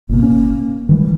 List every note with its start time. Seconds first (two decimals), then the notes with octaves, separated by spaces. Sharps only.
0.09 G1 B2 A#3
0.23 C#4
0.89 D#3 E3 G3 G#3